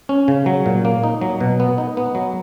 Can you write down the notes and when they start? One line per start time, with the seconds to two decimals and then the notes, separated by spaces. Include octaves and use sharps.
0.09 C#4
0.28 C#3
0.46 F#3
0.66 A#2
0.85 A#3
1.04 D#4
1.21 F#3
1.41 B2
1.60 B3
1.78 D#4
1.97 B3
2.15 F#3